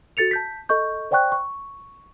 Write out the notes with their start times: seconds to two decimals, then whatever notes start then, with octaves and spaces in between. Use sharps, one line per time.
0.17 F#4 A4 A6 C#7 F7
0.31 A5 G6 B6
0.69 A4 D#5 C#6 G6
1.11 C5 D5 F#5 G5 C#6 F#6
1.32 C#6